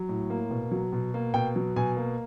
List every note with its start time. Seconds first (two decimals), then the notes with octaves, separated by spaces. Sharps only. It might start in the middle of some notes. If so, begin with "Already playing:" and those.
Already playing: F#3
0.09 A2
0.30 A#3
0.51 B2
0.71 F#3
0.93 B2
1.14 A#3
1.34 B2 G5
1.56 F#3
1.76 B2 G#5
1.97 A#3